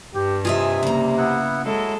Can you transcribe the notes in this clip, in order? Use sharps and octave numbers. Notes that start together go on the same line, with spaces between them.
G2 G4
C3 F4 G#4 D#5 E5 G#5
C#3 G3 A#3 A#5
B3 E4 F#5
F#3 G#3 E4 A4